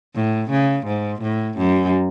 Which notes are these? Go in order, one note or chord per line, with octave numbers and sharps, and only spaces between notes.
A2
C#3
G#2
A2
F#2